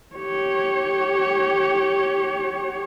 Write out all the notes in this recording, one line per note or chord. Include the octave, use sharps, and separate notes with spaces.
G4 C#5